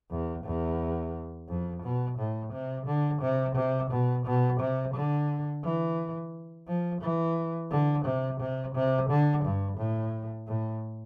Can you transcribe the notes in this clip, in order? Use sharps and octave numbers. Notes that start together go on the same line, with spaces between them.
E2
E2
F2
B2
A2
C3
D3
C3
C3
B2
B2
C3
D3
E3
F3
E3
D3
C3
C3
C3
D3
G2
A2
A2